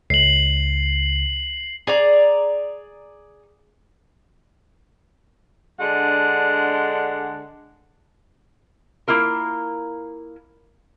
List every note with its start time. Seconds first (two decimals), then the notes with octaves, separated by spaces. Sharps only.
0.10 C#2 C7 F#7
1.87 G#4 D5 A#5
5.80 D3 G#3 D4 F#5
9.08 A#3 E4 F4 A#4